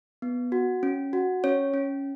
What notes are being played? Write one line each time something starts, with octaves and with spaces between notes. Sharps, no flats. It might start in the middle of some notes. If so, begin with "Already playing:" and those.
B3
F#4
C#4
F#4
C#4 C#5
C#4